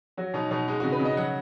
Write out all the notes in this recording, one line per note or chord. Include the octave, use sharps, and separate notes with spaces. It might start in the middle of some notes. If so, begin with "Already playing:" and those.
F#3 F#4
B2 D#4
B2 D#4
G#3 D#4
C#3 F#4
B4
C#3
D#5
F#3 F#5